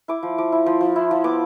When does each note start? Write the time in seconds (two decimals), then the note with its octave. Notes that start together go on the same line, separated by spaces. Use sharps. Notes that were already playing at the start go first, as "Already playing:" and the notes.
0.08 E4 D6
0.23 F3
0.38 F3 D6
0.52 E4
0.66 F3 C6
0.81 F3
0.96 E4
1.11 F3
1.24 B3 D6